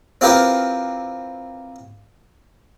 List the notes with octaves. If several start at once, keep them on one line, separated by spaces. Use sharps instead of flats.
C4 E4 F4 G4 A#4 B4